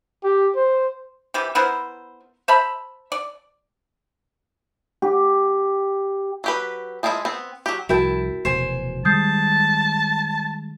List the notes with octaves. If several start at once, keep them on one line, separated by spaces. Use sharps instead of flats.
G4
C5
C3 E3 G4
B3 E4 A#4 C5
C5 E5 A5 B5
D5
G4
F#3 G4 B4
F3 G#3 D#4 E4 E5
B3 C4
F#3 G4
C2 F2 E4 F#4 A#4 G5 A5
F1 E2 B2 C5 G#5
D#3 G3 G#3 A5 D#6 G6 C7